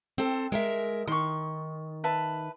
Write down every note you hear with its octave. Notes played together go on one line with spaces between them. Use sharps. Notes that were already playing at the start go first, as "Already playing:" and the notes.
C4 A4
G#3 A#4 E5
D#3 C6 C#6
B4 E5 A5